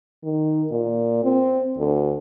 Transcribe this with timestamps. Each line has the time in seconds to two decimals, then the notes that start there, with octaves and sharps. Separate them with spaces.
0.23 D#3
0.71 A#2
1.24 C4
1.78 D2